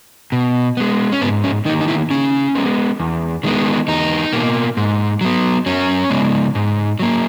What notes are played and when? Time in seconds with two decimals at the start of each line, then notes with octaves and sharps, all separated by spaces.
0.32 B2
0.77 G#3 B3
1.12 C#4
1.21 G#2 B3
1.44 C#4
1.65 D#3 D#4
1.69 A#3
1.81 D#4
1.88 E4
2.10 C#3 C#4
2.55 G#3 B3
3.00 E2
3.43 D#3 G#3 B3
3.88 E2 D#4
4.33 B2 A#3
4.77 G#2
5.21 F#3 B3
5.66 F#2 C#4
6.10 C#3 G#3 B3
6.55 G#2
7.00 F#3 A#3